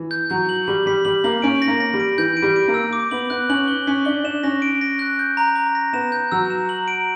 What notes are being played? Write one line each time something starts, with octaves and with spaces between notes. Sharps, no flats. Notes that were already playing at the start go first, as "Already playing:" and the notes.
Already playing: E3
G6
F#3 G6
F#7
G3 F#7
G3 B6
G3 F#7
A#3 F#7
C#4 D7
A#6
A#3
A#6
G3
D7
E3 G6
D7
G3
D7
A#3
E6
D6
B3 F#7
B3 F#6
C#4 F#7
G7
C#4 B6
D4 G7
D4 E7
C#4 A#6
D7
A#6
F#6
G6
A#5
A#5
A#6
B3 E7
G6
F#3 E6
E7
F#7
D7